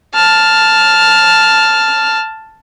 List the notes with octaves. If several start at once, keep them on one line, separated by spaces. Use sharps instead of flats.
A5 F6